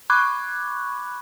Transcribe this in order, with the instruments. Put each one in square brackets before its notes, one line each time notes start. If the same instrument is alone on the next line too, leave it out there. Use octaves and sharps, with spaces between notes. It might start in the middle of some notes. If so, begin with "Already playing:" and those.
[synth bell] B5 C#6 D6 F#6 G#6